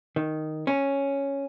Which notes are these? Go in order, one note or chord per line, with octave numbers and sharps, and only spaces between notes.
D#3
C#4